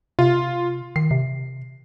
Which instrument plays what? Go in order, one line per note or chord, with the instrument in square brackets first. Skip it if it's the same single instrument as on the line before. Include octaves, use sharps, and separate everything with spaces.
[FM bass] C3 [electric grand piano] F4
[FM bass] D#3 [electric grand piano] C7
[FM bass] C3